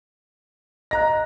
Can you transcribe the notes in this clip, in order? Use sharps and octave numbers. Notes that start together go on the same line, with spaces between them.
D#5 A#5 F#6 A#6